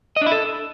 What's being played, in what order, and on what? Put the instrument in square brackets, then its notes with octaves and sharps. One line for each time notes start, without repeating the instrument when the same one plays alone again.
[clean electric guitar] D#5
D4
E4
A4